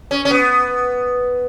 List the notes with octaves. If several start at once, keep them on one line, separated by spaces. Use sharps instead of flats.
C#4
C#4
B3